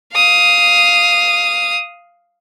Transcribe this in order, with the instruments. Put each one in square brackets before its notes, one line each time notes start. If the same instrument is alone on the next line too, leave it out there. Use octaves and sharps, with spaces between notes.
[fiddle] F5 D#6